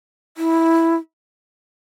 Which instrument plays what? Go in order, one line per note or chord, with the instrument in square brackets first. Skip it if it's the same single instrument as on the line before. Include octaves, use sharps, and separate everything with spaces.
[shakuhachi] E4